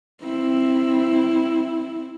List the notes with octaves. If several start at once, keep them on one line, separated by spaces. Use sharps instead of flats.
C4 E4